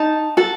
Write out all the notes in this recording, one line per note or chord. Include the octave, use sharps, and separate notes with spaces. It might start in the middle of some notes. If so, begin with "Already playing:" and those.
Already playing: D#4 A5
F#4 A4